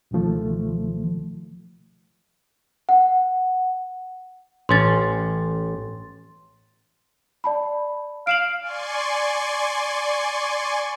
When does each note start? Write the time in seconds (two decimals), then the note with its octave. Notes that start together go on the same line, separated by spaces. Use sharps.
0.11 C#2 B2 D#3 F3 A3
2.89 F#5
4.69 A1 C#4 C6 A6
7.44 D5 A5 B5
8.27 F5 D7 E7 F#7
8.61 D5 G#5 C6 C#6